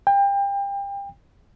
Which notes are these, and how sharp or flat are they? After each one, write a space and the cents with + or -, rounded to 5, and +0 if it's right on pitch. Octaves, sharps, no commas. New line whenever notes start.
G5 +30